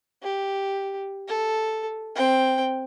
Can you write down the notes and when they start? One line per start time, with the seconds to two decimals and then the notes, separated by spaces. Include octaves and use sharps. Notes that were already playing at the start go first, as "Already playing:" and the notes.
0.22 G4
1.28 A4
2.15 C4 G5